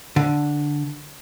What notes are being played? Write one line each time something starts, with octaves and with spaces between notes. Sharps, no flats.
D3